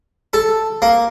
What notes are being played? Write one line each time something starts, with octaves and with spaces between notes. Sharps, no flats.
A4
A#3